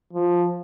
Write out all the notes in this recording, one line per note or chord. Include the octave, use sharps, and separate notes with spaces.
F3